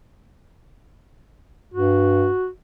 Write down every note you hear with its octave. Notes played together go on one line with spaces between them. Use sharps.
G2 F#4